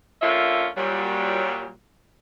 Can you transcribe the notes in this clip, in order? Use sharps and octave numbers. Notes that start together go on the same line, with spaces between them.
D3 F3 A#3 C#4 F4 E5
A#2 F#3 G3